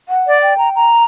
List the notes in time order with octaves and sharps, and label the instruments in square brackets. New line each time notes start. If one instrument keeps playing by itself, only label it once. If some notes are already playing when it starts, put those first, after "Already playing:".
[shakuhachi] F#5
[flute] D5
[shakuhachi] G5
[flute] A#5
A#5